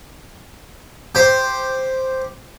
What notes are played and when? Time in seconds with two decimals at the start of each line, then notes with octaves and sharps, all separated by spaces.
1.15 G4 C5